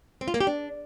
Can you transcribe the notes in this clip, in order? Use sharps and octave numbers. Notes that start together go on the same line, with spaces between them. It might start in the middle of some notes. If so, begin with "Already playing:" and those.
C4
F4
A#3
G4
D4